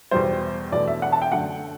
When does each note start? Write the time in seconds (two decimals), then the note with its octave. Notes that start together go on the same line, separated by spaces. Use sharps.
0.11 E2 B2 G3 C5
0.72 E1 E2 B2 A3 D5
0.88 E5
1.02 F#5
1.12 A5
1.22 G5
1.32 F#2 D3 A3 F#5